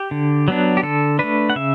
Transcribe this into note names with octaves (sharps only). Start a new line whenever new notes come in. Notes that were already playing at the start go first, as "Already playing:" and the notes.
Already playing: G4
D3
F#3 B3 D4
G4
D3 A4
A3 D4 B4
F#5
C#3 E5